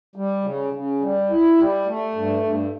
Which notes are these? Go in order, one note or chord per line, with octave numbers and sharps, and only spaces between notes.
G3
C#3
C#3
G3
E4
G3
A3
G2
G2